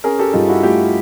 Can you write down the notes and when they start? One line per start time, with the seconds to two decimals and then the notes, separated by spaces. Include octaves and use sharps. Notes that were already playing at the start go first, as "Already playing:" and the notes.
0.04 C#4 G#4 A#4
0.19 G4 A4
0.33 G2 D#4 F4
0.48 E4 F#4
0.62 A3 F4 G4